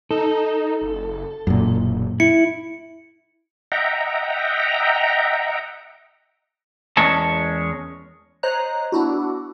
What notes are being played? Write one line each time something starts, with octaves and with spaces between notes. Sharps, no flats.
D#4 A4
F#1
E1 F#2 A#2
E4 C#7
D#5 E5 F#5 G5 A#5
E2 G#3 C#4 A#4 C#5 A5
C5 C#5 D#5 A#5 F#6
B3 D4 E4 F#4